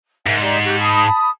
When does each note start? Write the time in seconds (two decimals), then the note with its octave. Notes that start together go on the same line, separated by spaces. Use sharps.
0.26 G#2 A#4 E5 G#5
0.41 G4 D5 D#5
0.63 G4 C#6 F#6
0.79 A5 B5 D#6